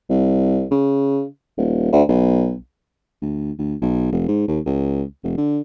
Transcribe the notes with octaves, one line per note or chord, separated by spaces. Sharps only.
C2
C#3
D#1
D2
B1
D2
D2
B1
F1
G#2
D#2
C#2
F1
D3